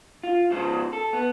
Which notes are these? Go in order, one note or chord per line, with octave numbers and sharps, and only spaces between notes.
F4
G#2 C#3 F3 G#3 C5
A4
B3